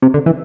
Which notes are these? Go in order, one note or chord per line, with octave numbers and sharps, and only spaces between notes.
C3
D3
E3